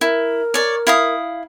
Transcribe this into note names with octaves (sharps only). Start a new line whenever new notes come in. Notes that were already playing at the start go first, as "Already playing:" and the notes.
E4 A#4
C#5 D5
E4 F5 D#6